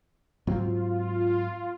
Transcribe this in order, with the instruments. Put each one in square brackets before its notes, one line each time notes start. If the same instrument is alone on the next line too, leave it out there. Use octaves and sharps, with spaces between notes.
[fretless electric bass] G#2 F#3 C4 [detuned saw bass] F4